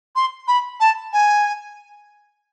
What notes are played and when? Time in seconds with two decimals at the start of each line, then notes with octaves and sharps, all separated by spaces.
0.16 C6
0.48 B5
0.80 A5
1.13 G#5